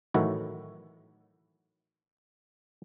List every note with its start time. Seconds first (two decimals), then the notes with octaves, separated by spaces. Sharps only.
0.14 A2 D#3 E3 F#3 E4 F#4